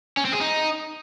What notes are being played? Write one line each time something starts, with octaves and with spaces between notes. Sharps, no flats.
C#4
C4
G#4
D#4